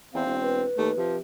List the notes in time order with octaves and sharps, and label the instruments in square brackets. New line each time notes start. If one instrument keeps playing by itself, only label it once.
[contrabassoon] E2 [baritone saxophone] C4 [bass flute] F5
[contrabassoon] E1
[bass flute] B4
[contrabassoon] D#2 [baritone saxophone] A3
[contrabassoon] C3 [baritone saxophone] F3